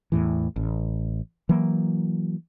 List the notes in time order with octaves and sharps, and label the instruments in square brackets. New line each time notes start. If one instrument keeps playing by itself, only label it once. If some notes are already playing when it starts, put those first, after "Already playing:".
[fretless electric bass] E2 A2 E3
A1
E3 F#3 A#3